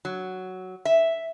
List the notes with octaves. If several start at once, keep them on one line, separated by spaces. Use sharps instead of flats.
F#3
E5